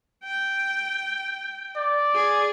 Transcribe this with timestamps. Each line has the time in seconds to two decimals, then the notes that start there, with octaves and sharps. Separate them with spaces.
0.24 G5
1.77 D5
2.15 G#4